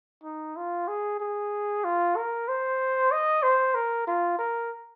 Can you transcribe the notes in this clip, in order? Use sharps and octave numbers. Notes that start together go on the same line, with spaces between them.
D#4
F4
G#4
G#4
F4
A#4
C5
D#5
C5
A#4
F4
A#4